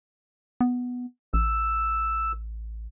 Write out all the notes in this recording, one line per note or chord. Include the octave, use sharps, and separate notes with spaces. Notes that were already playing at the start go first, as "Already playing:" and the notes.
B3
A1 E6